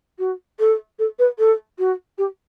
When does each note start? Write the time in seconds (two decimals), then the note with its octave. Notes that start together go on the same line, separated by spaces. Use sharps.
0.19 F#4
0.59 A4
0.99 A4
1.19 B4
1.39 A4
1.79 F#4
2.18 G4